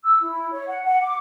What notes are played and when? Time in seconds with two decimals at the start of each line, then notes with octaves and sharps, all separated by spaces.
0.04 E6
0.21 E4
0.51 C#5
0.67 F#5
0.84 F#5
1.02 D6